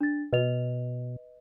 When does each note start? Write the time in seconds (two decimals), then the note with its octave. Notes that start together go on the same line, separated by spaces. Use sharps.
0.01 D4 A6
0.33 B2 B4 D#5 F7